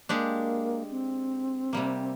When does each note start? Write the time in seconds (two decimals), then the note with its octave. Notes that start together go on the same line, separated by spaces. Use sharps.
0.09 G#3 A#3 D4 G4
0.91 C4
1.73 C3 G3 A#3